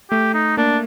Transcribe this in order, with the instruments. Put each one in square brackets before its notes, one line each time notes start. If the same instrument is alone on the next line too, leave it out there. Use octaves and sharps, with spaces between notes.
[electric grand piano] A3 [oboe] G4
[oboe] D#4
[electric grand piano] A#3 [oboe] D4